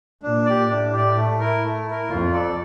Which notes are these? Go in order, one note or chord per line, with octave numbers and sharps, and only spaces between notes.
A#2 D4
G4 D5
A2 D4
G4 D5
A3
E4 A#4
A3
E4 A#4
F2 F4
A4 D5